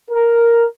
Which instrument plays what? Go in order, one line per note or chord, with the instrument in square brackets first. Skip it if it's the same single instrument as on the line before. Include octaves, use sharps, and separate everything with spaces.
[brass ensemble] A#4